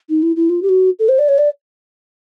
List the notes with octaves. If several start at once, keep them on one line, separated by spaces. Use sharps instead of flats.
D#4
E4
E4
F4
G4
F#4
A4
C5
D5
C#5
D5